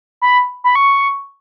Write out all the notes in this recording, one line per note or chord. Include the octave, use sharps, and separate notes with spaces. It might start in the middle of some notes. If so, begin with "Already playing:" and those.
B5
B5
C#6